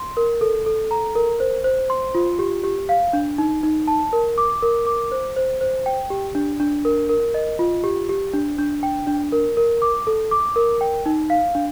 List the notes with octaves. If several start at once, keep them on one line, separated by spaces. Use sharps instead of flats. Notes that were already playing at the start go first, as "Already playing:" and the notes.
Already playing: C6
A#4
A4
A4
A#5
A#4
C5
C5
C6
F4
G4
G4
F5
D4
D#4
D#4
A5
A#4
D6
A#4
D6
C5
C5
C5
G5
G4
D4
D4
A#4
A#4
D#5
F4
G4
G4
D4
D4
G5
D4
A#4
A#4
D6
A4
D6
A#4
G5
D#4
F5
D4